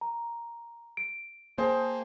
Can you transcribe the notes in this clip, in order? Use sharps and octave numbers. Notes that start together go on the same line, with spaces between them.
A#5
D7
A#3 G#4 C5 G5 A5